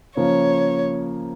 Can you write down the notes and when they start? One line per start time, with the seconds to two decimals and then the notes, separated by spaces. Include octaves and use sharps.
0.16 C#3 F3 A#3 C#5